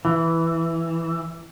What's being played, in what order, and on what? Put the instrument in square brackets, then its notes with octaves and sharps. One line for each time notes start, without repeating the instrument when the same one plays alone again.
[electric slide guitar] E3